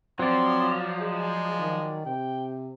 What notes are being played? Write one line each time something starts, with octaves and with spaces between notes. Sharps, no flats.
F3 F#3 C4 D5 C6
G#3 G#4
D#3
C3 G5